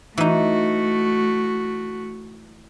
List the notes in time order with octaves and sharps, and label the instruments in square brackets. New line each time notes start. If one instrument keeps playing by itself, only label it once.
[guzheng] E3 D#4 [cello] A3 F#4